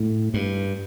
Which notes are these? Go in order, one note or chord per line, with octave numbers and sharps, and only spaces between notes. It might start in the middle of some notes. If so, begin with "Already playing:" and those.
Already playing: A2
G2